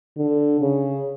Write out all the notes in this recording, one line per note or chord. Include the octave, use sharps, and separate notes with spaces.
D3
C#3